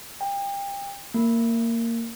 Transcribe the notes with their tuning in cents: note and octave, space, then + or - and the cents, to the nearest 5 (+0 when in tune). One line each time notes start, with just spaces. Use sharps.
G5 +30
A#3 -15